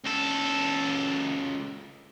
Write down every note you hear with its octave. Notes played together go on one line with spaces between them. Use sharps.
C#2 A4